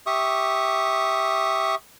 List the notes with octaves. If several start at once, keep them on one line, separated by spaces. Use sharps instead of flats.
G4 E5 C#6 D#6